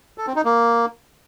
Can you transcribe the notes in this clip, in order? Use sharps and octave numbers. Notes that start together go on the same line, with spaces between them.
A4
C4
D#4
A#3